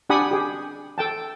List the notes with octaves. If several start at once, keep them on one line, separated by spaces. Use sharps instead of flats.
D4 G4 F#5 G#5 B5 D#6
G4 G#4
A4 G5 A5